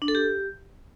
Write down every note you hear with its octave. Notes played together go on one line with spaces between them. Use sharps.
D4
A4
G4